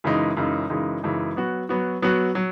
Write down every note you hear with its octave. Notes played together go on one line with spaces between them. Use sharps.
F#2 C#3 E3 G#3 D#4
F#2 C#3 E3 G#3 D#4
F#2 C#3 E3 G#3 D#4
F#2 C#3 E3 G#3 D#4
F#3 B3 F#4
F#3 B3 F#4
F#3 B3 F#4
F#3